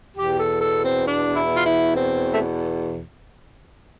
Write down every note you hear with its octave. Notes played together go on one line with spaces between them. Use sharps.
E2 B2 G4
A4
A4
C4
D4
E4
F4
E4
C4
A3